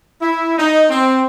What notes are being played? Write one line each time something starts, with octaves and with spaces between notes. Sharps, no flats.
E4
D#4
C4